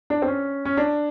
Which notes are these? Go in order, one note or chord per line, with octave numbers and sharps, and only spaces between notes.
D4
C4
C#4
C#4
D4